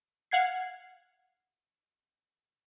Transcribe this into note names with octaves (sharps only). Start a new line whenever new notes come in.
F5 F#5 G#6 C7